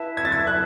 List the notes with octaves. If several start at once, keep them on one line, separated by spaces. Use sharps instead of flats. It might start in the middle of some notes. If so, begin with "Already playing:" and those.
Already playing: E4 B4 E5 A5
G#6
A6
G#6
F#6